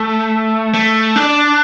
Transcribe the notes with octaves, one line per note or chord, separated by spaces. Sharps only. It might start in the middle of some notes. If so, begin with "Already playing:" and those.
Already playing: A3
A3
D4